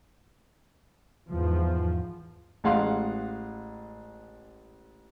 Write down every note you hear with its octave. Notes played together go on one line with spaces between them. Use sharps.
E2 G#2 F3
A1 G#3 F5 F#5 C6